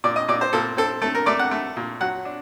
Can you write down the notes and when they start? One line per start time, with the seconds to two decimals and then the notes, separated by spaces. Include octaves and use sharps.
0.04 A#2 D5
0.16 D#5
0.28 A#2 D5
0.41 C5
0.53 A#2 A4
0.77 C4 A4
1.02 A3 A4
1.15 A#4
1.26 A3 D5
1.39 F#5
1.51 A3
1.77 A#2
2.01 F#3 F#5
2.25 D4